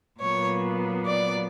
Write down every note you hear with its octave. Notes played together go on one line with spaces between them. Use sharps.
A#2 F#3 B3 C#5
D5